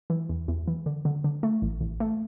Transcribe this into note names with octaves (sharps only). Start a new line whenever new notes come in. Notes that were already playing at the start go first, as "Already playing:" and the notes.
E3
E2
E2
E3
D3
D3
D3
A3
A1
A1
A3